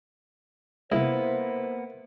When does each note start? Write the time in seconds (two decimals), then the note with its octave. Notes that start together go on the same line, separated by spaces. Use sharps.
0.92 C2 A#3 B3 E4 C5